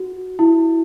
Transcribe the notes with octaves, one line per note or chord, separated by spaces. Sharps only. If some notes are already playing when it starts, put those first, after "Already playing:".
Already playing: F#4
E4